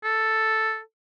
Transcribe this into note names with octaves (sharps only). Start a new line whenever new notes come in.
A4